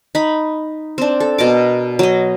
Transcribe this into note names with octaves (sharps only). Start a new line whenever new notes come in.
D#4 B5
C4 D4
A4
B2 A#4 D6
F#3 D#5